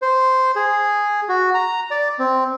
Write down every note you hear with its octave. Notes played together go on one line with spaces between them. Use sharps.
C5
G#4
F#4
A#5
D5
C4